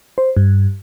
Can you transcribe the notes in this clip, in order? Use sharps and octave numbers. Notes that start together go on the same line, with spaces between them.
C5
G2